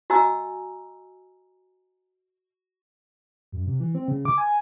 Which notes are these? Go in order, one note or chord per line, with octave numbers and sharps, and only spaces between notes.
F#4 D#5 G#5 A#5 E6
F#2
C3
E3
C4
C#3
D6
G#5